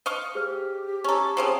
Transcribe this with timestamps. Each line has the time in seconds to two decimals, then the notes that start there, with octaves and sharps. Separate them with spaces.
0.06 D#5 F5 C#6
0.35 G4 G#4 C5 F6
1.04 C#4 A4 A#5 C#6
1.37 F3 C4 C#4 G#4